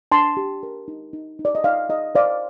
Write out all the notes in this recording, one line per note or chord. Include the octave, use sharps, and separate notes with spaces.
D4 A5 C6
G4
A#4
D#4
D#4
D#4
D5
D#5
D#4 D5 F5
D#4 D#5
C5 D5 F5